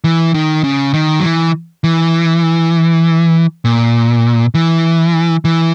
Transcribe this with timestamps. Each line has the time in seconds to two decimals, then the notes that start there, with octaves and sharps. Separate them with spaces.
0.04 E3
0.34 D#3
0.64 C#3
0.94 D#3
1.20 F#3
1.24 E3
1.84 E3
3.65 A#2
4.54 E3
5.45 E3